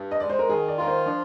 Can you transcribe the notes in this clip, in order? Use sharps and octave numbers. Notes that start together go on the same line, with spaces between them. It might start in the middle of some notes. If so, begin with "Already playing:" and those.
Already playing: G2 G4
D#5
G#3 D5
C5
A#4
D#3 G#4
D5
F4 A#4
C5
F3 D4